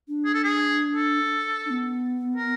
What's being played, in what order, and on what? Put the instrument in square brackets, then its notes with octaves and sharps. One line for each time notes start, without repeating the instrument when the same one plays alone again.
[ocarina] D4
[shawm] G#4
A4
G#4
A4
[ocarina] D4
B3
[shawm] A#4